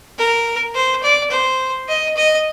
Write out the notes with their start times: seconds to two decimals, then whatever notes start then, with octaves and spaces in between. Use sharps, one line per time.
0.18 A#4
0.74 C5
1.03 D5
1.31 C5
1.88 D#5
2.16 D#5